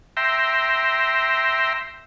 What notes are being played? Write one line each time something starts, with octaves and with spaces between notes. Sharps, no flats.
E5 G5 A#5 C6